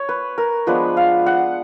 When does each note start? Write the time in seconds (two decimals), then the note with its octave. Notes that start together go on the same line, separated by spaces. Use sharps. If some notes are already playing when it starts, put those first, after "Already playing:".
Already playing: C#5
0.09 B4
0.38 A#4
0.67 F3 G#3 B3 D4 B4
0.97 F5
1.26 F#5